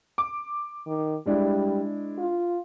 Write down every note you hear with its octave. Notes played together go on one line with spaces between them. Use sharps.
D6
D#3
G3 G#3 D4 E4
F4